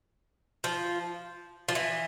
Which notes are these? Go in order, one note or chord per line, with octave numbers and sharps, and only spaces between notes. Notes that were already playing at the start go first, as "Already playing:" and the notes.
F3
F3
E3